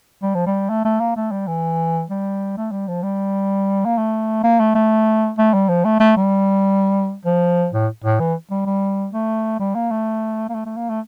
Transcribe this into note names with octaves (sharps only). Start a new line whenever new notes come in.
G3
F3
G3
A3
A3
A#3
A3
G3
E3
G3
A3
G3
F3
G3
A#3
A3
A#3
A3
A3
A3
G3
F3
A3
A3
G3
F3
A2
A2
E3
G3
G3
A3
G3
A#3
A3
A#3
A3
A3
A#3
A3